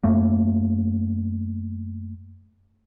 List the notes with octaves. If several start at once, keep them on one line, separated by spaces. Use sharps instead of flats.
F#2 A3 A#3